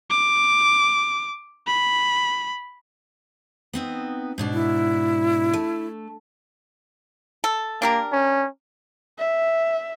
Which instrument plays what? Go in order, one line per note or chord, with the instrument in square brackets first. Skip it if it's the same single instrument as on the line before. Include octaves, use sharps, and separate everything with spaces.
[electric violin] D6
B5
[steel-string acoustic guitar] B3 C4 D#4
G#2 B2 D4
[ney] E4
[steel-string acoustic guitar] A3
[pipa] A4
[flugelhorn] A#3 [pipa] D4 G4 A#4
[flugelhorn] C#4
[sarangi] E5